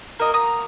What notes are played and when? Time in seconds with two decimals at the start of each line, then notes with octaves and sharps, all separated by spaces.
0.20 A#3 F#4 A#4 D#5
0.34 A#5 D#6